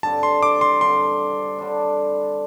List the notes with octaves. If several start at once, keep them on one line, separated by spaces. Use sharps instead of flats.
G2 D3 C4 A5
C6
D6
C6
G2 D3 C4 C6
D3 G3 D4